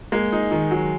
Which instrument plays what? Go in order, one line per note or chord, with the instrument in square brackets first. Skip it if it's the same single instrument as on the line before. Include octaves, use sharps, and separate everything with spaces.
[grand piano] G#3 [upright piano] A#3
[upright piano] D#4
D#3
F#3